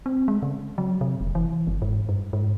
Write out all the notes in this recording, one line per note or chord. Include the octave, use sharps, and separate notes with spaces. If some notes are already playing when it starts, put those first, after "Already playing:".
C4
G#3
C#3
F#3
C3
F1
E3
G1
G#2
G2
G#2